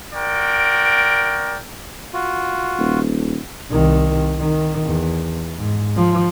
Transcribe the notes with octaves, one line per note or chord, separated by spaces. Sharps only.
F#4 A#4 D5 G5
F4 F#4
D#1
C2 D#3
D#3
E2
G#2
F3